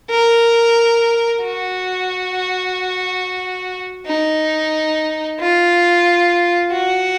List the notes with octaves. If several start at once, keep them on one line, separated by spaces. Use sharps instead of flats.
A#4
F#4
D#4
F4
F#4